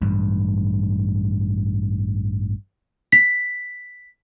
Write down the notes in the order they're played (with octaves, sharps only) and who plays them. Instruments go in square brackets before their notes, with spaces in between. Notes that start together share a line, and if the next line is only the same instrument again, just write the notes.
[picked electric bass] A1 G2
[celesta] B6